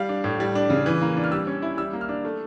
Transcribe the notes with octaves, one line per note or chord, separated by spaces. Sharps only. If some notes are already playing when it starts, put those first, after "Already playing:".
Already playing: G3 F5
D4
A2
G3
D4
C#3
E3
A#3
D4
F6
G3 E6
C#4
E4
G3 E6
A#3
F6
D4
A3